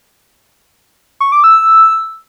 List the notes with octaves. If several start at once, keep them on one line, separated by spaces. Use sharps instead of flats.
C#6
D6
E6